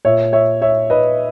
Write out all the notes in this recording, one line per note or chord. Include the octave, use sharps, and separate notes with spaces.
A#2 C#5 E5
C#5 E5
C#5 E5
B4 D#5